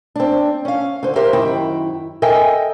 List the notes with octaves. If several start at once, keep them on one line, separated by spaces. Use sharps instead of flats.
C4 D4
C#4 F5
D3 C5
G4 A#4 C5 E5
F#2 D#3 E4 G5
A4 A#4 D#5 E5 G5 G#5